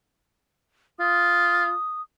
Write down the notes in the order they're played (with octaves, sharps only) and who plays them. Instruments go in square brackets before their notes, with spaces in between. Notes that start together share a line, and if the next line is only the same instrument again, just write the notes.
[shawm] F4 [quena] D#6